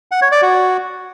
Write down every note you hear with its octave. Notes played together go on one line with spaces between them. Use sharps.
F#5
C#5
D5
F#4